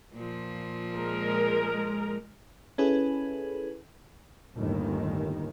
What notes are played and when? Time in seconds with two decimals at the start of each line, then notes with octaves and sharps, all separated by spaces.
0.14 A#2 F3
0.95 G#3 A#4
2.78 C#4 E4 G#4 A4 B4
4.56 G1 D#2 A2 D#3